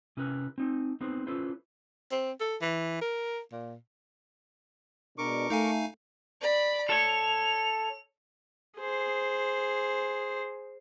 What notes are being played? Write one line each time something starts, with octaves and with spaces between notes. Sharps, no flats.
C3 C#4 E4 A#4 B4
C4 D#4
B3 C4 D#4 G#4 B4 C5
C#4 E4 F4 A4 B4 C5
C4
A4
E3
A#4
A#2
B2 G#3 D4 A#4 C#6 D6
A3 D#4 F5 G#5
D5 B5
A4 C#5 F7
G#4 C5